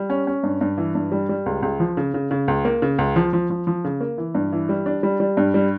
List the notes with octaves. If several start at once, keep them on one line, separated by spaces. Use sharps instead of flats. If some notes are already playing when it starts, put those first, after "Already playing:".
Already playing: G3
C#4
C#4
G2
G2
E3
G2
G3
G3
C#2
C#2
F3
C#3
C#3
C#3
C#2
A#3
C#3
C#2
F3
F3
F3
F3
C#3
A#3
E3
G2
E3
G3
D4
G3
G3
G2
G3